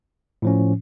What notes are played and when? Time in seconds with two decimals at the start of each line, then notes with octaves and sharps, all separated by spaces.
0.42 A2 F3 C#4